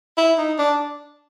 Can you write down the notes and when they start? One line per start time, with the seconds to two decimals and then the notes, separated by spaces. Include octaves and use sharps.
0.17 E4
0.38 D#4
0.58 D4